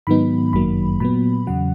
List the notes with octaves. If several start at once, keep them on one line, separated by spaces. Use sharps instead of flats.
G#2 D#3 F#3 B3 D#4 B5
G1 F#2 D#3 F#3 A#3 B5
A#2 F#3 B3 B5
E2 C#3 F#3 F#5